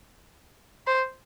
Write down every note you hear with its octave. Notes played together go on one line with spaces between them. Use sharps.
C5